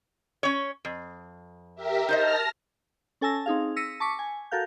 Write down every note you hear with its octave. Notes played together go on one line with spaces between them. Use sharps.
C#4 C#5
F2
G4 A#4 E5
D#4 C5 D#5 A5 F6 A#6
C#4 A4 G#5 A5 E6 A#6
C4 D#4 G#4 F5
E6 A#6 B6 C#7 D#7
A5 C#6 D6 B6 C#7
G#5
F#4 A4 A#4 F5 G6